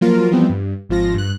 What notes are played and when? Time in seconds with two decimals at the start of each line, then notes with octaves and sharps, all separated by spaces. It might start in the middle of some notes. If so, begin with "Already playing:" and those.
0.01 F3 F#3 A#3 F4 A#4
0.31 E3 F3 G3 B3 C4
0.49 G2
0.89 G#1 F3 F4 A#6
1.14 G2 F#6